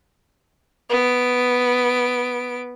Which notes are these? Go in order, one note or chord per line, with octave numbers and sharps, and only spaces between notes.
B3 D7